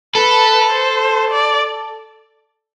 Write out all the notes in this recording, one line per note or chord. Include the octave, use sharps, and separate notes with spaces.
A4 B4
C5
D5